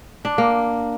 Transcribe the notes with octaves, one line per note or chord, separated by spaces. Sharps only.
D4
A#3